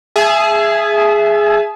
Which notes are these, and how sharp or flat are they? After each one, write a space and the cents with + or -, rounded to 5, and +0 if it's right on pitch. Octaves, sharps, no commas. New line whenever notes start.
G#4 +0 E5 +15 A5 -45